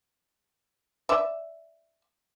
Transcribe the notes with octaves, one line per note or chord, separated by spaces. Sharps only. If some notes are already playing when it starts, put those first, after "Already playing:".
D5 E5